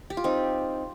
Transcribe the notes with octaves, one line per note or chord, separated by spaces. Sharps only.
G4
F4
C4 D#4